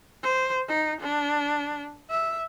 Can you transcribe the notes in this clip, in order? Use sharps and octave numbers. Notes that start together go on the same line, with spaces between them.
C5
D#4
D4
E5